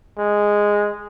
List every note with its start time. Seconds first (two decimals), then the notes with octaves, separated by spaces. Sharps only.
0.19 G#3